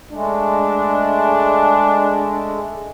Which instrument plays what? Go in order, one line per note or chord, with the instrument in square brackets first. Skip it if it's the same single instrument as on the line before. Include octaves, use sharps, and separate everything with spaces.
[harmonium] G#3 A3 [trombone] D4